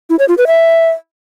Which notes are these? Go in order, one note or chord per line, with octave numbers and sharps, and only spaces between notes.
E4
C#5
F4
B4
E5